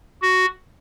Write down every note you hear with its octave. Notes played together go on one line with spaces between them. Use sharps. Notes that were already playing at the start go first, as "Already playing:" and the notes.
F#4